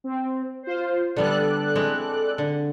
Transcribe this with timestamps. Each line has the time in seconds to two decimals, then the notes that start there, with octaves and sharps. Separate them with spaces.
0.04 C4
0.63 F4 C5
1.16 D3 G3 B3 A4 D5 F#6
1.75 G#3 C4 E4
2.38 D3